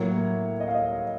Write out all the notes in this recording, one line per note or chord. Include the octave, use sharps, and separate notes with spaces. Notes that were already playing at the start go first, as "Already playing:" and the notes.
Already playing: A2 F#3 A#3 C#5
D#5
F5
D#5